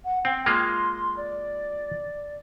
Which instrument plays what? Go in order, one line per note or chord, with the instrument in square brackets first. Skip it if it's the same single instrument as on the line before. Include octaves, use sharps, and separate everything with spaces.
[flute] F#5
[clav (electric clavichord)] C4 [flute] G5
[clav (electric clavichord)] G#3 A#3 F4 [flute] C6
[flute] D5